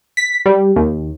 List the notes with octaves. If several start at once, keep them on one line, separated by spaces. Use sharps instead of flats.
B6
G3
D#2